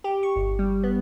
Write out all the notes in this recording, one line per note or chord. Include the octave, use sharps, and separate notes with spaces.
G4
C#6
G1
G3
B3